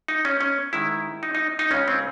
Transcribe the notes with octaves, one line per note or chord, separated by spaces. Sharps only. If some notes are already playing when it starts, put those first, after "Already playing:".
D#4
C#4
C#4
G#2 D#3 G#3 E4
D#4
D#4
D#4
C#2 C#3 G#3 C#4
C4